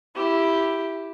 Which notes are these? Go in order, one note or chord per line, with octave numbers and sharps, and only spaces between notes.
E4 G4